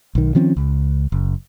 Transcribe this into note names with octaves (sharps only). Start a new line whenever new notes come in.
B1 D#3
D#3 F3 C4 C#4
C#2
F#1